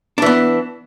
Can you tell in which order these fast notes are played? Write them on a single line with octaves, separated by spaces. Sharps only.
D4 E3 B3